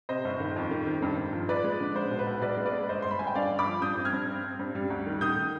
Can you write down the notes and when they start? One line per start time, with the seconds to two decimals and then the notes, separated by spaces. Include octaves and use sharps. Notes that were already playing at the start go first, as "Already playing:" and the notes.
0.09 C3 C5 D#5
0.25 G1
0.40 D#3
0.56 F2
0.71 D#3
0.86 D#3
1.02 G2
1.17 G2
1.33 F3
1.49 F3 B4 D5
1.64 G#3
1.80 D3
1.95 G#3 C5
2.11 B2
2.19 B4
2.27 B1
2.42 B1 B4 D5
2.57 G#3
2.65 B4 D5
2.73 G#3
2.89 G1 C5 D#5
3.02 G1 C6
3.11 B5
3.19 G1 G#5
3.27 G5
3.35 G2 D5 F5
3.51 G1
3.59 B5 D6
3.66 F3
3.82 G2 D#6 G6
3.98 C4
4.05 F6 G#6
4.13 G2
4.28 C4
4.44 C4
4.59 G2
4.75 G3
4.90 D2
5.06 D#3
5.21 D#3 D#6 G6